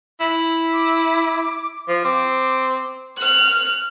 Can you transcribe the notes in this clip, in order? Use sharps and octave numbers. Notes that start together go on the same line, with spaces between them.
E4
D6
F3
C4 D6
F6 F#6